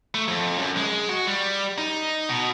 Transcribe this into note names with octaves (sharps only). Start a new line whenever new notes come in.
A3
F2
F#2
G#3
F#4
G3
D#4
B2